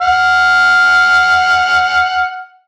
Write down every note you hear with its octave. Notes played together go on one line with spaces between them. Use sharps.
F#5 F6